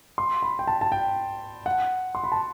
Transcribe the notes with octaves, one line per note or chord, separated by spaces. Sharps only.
C6
B5
G5
A5
A5
G5
F#5
C6
B5
A5